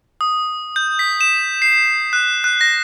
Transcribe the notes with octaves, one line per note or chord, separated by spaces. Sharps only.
D#6
G6
B6
E7
C7
F#6
F#6
A#6